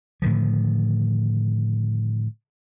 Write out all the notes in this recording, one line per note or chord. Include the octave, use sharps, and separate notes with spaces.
A2 D3 D#3 F3